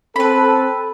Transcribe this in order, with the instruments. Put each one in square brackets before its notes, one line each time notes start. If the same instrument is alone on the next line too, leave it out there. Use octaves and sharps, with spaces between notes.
[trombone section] C4 A4 [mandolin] B4 B5